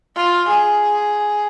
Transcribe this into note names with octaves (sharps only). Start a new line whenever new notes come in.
F4
G#4